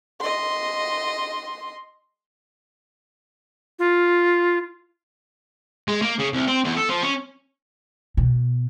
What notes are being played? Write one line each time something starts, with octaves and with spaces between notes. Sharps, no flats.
D#5 C6
F4
G#3
A#3
C#3
C2
C4
E2
A4
F3
C#4
B2